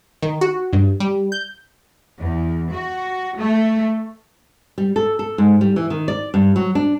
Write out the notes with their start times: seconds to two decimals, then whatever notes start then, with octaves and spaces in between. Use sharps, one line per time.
0.22 D#3
0.41 F#4
0.73 G2
1.00 G3
1.32 G6
2.19 E2
2.72 F#4
3.39 A3
4.78 G3
4.96 A4
5.19 A4
5.38 G#2
5.61 G3
5.76 E3
5.90 D#3
6.08 D5
6.34 G2
6.56 F#3
6.75 D4